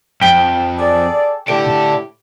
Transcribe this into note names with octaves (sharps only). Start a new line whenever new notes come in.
F2 G5 B6 G7
G#4 A4 D5
A2 D4 E4 G4 A4 D7